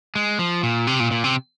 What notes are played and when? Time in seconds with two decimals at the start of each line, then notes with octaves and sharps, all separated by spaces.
0.15 G#3
0.39 F3
0.63 A#2
0.87 C3
1.00 A#2
1.11 A#2
1.24 C3